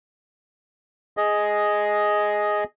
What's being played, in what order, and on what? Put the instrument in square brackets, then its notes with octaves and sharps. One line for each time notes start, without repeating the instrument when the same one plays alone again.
[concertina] G#4 D#5